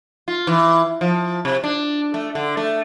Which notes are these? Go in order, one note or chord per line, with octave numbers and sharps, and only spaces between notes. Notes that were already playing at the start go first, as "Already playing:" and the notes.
F4
E3
F3
C3
D4
A3
D3
A3